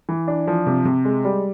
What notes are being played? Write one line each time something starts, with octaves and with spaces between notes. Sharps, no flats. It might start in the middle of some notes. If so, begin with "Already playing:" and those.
E3
D4
F3
C3
C3
G#3
G3